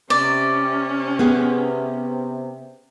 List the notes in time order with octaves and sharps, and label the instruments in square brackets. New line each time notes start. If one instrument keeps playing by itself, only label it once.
[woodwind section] C3 [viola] C#4 [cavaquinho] D5
[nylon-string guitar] B3 G4 G#4